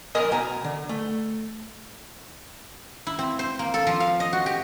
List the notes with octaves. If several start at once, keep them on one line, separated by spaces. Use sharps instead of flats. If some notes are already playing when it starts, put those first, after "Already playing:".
B1 A#4 D#5 G#5
B2 G#5 A#5
D3
A3
E4
C4
C5
A#3
A4
F3
F5
D#5
F#4
G4